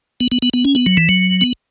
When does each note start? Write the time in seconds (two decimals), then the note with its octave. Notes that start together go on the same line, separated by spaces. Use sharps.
0.20 B3
0.32 B3
0.42 B3
0.54 B3
0.65 C#4
0.75 B3
0.86 F#3
0.97 E3
1.09 F#3
1.41 B3